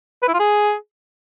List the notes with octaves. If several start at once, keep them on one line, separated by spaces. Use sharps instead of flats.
B4
E4
F4
G#4